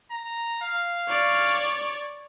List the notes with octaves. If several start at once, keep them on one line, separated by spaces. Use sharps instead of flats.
A#5
F5
C#5 D5